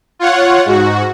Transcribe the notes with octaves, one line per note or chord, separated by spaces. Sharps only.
F4 C#5 F#5
G#2 F#4